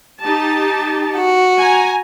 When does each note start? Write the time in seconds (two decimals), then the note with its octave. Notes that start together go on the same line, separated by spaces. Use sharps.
0.21 D#4 G4 A5
1.16 F#4
1.58 G#5 A#5